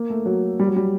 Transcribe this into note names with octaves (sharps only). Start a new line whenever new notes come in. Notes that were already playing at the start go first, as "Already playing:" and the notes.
Already playing: A#3
A3
F#3
G3
F#3
G3